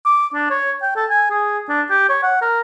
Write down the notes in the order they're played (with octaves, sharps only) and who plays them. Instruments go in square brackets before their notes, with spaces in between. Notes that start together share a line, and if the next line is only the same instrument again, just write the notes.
[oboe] D6
D4
C#5
G5
A4
G#5
G#4
D4
G4
C#5
F#5
A#4